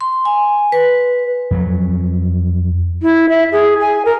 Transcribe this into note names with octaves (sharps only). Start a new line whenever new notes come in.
C6
G#5
B4
F2 F#3
E4
E5
G#4
G#5
A#4